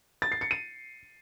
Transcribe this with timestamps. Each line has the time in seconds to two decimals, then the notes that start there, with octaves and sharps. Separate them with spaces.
0.22 A6
0.32 C7
0.41 C#7
0.51 D#7